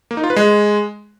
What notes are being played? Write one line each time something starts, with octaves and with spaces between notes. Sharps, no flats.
A#3
D#4
F4
B4
G#3